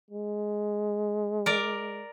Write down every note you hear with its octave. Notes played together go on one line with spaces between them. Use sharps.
G#3
A#4 D5